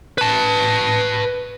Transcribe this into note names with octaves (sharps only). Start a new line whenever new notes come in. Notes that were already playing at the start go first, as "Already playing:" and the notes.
B4 A5